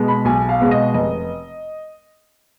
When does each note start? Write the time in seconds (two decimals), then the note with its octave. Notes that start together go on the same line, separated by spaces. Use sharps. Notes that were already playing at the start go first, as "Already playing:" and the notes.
Already playing: B2 G#3 B3
0.08 B5
0.25 B1 G#5
0.49 F5
0.61 B2 G#3 B3
0.71 D#5
0.94 F1 D#5